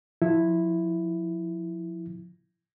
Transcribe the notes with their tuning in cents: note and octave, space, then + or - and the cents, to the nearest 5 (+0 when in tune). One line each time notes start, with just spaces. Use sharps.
F3 +25 E4 +0